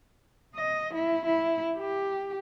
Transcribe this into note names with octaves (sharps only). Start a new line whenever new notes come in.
D#5
E4
E4
G4